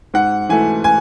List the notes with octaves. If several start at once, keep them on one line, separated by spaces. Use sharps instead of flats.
G#2 F#5
E3 A3 G#5
G#5